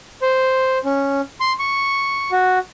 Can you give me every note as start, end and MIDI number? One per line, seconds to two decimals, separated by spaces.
0.22 0.78 72
0.84 1.21 61
1.41 1.53 84
1.59 2.31 85
2.31 2.59 66